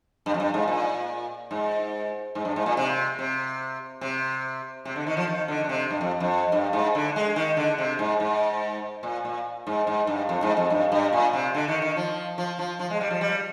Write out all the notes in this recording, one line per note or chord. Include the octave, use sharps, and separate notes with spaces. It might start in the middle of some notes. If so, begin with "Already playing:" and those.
G2
F2
G2
G#2
A#2
G#2
G#2
G2
G#2
A#2
C3
C3
C3
C3
D3
D#3
F3
D#3
D3
D3
C3
G2
F2
F2
G2
G#2
D3
G#3
D#3
D3
C3
G#2
G#2
A#2
A#2
G#2
G#2
G2
F2
G#2
F2
G2
G2
A#2
C3
D3
D#3
D#3
F3
F3
F3
F3
G#3
G3
F3
G3